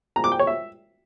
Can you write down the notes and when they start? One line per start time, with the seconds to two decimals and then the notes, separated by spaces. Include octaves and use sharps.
0.16 A#5
0.24 D6
0.32 G5
0.39 C#5
0.47 E5